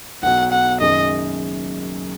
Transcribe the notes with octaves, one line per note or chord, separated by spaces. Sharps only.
B1 B2 F#3 F#5
F#5
F#1 F#2 D#3 G#3 D#5